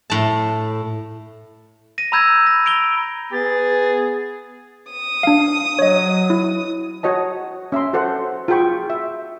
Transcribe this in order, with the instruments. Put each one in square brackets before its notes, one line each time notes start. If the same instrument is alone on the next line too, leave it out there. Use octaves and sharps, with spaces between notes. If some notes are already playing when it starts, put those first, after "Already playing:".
[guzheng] A2 A5
[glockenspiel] A#6 D#7
A#5 B5 E6 G6 G#6 A#6
A#6
D7 F7 G7
[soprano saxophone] B3 [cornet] G#4 [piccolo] A6
[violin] D#6
[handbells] D4 F5
[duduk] F#3 [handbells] C#5 D#5
[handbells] E4
[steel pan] F#4 C#5 D#5 A5
C#4 E5 A#5 C6
F#4 A4 C5 F#5
F4 F#4 G#4 G5 B5 C#6
E5